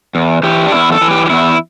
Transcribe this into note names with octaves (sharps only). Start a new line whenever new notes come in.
E2
E3 G4
D4
E2 E4
A4
E3
G4
G4
E2 E4